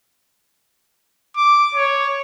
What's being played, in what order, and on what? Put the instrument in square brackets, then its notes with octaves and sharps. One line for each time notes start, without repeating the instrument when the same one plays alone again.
[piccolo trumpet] D6
C#5